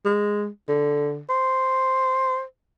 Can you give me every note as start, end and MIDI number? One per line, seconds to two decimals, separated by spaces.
0.05 0.47 56
0.68 1.21 50
1.30 2.42 72